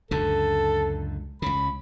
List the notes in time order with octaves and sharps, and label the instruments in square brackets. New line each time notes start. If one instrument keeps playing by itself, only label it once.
[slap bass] C#2 F#2 D3 [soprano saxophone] A4
[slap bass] C#2 C#3 [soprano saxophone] B5